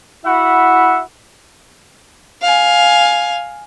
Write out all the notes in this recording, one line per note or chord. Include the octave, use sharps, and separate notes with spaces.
E4 F#4 E5 F#5 B5
F5 G#5